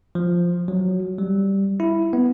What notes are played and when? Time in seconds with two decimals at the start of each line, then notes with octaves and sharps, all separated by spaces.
0.15 F3
0.68 F#3
1.18 G3
1.80 E4
2.13 B3